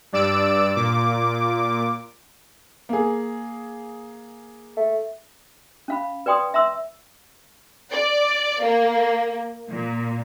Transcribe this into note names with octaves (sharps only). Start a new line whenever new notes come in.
G2 D5 E6 D7
A#2 D6
A#3 G#4
A3
C#4 F5 B5
B4 D5 G5 C6 D#6
E5 A#5 C6 E6
D5
A#3
A#2